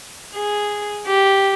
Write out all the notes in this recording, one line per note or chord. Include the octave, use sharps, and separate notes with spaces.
G#4
G4